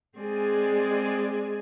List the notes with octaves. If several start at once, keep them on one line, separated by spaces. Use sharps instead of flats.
G#3 C4 D5 G#5